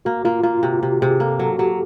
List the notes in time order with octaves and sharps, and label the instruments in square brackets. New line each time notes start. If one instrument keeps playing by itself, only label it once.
[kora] A#3 [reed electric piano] F#4
[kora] A#3 [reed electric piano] F4
[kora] A#3 [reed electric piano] F4
[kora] C3 [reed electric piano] F#4
[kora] C3 [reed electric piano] G4
[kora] C3 [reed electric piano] G#4
[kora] A#3 [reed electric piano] A4
[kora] F#3 [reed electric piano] A4
[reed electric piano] F#4
[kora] F#3 [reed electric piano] G4